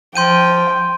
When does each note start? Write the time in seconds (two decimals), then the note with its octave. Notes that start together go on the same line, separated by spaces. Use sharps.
0.16 F3 G5 C6 G6 D#7